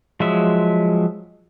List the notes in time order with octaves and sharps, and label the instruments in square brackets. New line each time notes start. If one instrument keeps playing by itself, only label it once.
[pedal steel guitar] F3 F#3 G#3 E5